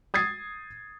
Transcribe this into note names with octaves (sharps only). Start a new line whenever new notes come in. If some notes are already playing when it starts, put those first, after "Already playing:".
D#6 G#6 A6 C7